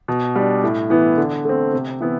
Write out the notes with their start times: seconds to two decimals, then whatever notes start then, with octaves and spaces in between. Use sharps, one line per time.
0.08 B2
0.36 G3 D4
0.63 A2
0.90 E3 B3 E4
1.17 D3
1.45 A3 C4
1.73 C3
2.00 E3 B3 E4